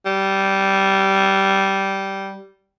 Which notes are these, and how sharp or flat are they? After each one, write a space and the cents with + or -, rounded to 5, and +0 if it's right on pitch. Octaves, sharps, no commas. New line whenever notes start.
G3 -15